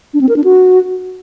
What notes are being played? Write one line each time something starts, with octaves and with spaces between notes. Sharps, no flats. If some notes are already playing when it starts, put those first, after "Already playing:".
D4
C4
A#4
D4
F#4